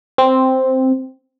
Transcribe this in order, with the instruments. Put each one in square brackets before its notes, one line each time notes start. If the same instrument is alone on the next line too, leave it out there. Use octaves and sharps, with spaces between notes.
[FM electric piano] C4